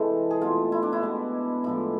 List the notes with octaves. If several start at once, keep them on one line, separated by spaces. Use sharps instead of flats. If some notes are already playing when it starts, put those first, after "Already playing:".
Already playing: C3 E3 G#3 A4
G#4
B2 A3 C4 F4
E4
D4
E4
B2 G#3 B3
A2 F3 G#3 E4